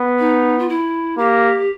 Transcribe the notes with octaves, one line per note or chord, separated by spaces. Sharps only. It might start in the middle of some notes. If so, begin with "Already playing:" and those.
Already playing: B3
D#4
F4
E4
A#3 G4